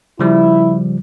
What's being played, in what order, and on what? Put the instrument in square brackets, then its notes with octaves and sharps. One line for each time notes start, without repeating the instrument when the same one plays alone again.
[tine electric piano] C#3 F3 G3 [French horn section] E4